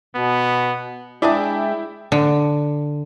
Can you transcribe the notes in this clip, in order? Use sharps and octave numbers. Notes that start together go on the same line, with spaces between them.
B2 B3
G#3 D4 E4 G#4 D5 G5
D3